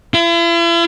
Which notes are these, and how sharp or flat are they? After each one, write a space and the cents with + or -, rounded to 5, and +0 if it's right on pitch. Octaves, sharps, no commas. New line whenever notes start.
E4 +45